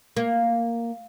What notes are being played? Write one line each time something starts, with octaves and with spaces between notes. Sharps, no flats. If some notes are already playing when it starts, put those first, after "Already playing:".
A#3